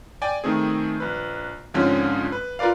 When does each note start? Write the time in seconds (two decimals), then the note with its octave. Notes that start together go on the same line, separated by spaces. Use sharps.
0.22 D5 G5 G#5
0.44 D#3 A3 C4 G#4
1.00 A#1 B4
1.74 G#2 D3 F3 G#3 C4 C#4
2.32 B4
2.59 F4 A#4 B4 D5 F5